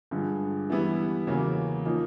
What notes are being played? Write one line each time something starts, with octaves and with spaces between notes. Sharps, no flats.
G2 D3 F3 G#3
E3 G3 B3 E4
E2 C#3 F#3 A#3
F3 A#3 D#4